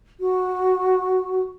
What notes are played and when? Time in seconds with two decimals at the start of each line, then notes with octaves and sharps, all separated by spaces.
0.20 F#4